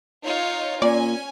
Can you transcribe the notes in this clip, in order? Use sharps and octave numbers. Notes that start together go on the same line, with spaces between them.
D#4 F4 C#5
A#2 C#4 D5 G#5